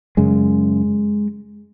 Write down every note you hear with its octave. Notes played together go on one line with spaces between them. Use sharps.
F#2 C#3 G#3